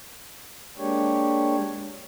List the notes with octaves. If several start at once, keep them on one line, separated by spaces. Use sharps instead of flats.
G#3 A#3 D4 G4 C#5